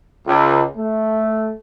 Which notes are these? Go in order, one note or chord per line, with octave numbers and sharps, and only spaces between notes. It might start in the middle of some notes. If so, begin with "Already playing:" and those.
C#2
A3